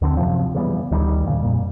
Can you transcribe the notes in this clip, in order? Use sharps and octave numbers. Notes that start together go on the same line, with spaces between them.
D#2 D3 B3 C4
F#2 C3 F3
C#3 E3 G3 B3
D2 D#3 F#3 G3
F2 A#2 C#3
F2 A#2